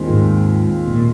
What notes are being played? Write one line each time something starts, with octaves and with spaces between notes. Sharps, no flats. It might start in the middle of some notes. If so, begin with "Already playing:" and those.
Already playing: D#2 D#3 G#3 C4 F4
G#2
A#2